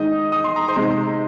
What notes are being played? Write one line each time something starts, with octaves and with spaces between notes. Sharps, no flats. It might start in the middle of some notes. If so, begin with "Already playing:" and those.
Already playing: D#3 G#3 D#4 D#5 D#6
D#6
C6
A#5
C5 C6
C3 G#3 D#4